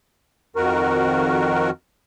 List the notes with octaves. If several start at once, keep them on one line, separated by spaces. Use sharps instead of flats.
F2 D#3 F#4 A#4